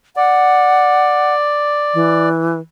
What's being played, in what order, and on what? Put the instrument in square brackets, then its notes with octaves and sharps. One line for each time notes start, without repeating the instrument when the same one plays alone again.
[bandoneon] D5 [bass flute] F#5
[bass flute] E3